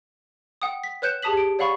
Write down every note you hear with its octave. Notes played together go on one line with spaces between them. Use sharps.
F#5 G5 D#6
B6
B4 C#5 F#6 G6 C#7 E7
G4 G#4 A5 D#6 B6 F#7
D7
C#5 D5 F5 F#5 B5 C#6